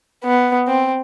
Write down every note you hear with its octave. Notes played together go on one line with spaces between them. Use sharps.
B3
C4